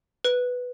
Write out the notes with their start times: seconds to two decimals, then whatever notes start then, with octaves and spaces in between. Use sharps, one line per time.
0.25 B4